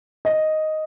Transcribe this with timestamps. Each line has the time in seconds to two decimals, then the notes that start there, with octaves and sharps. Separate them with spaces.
0.25 D#5